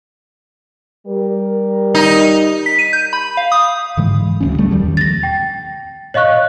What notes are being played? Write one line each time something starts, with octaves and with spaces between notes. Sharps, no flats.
G3 A#4
D#4
B6
D#7
G6
B5
F5
D#6
G#2 D3 E3 G#3
D2 G#3 C#4
G3 A3
E2 D#3 F3 G3
A6 A#6
G5
C#5 D#5 F5 C#6 F#6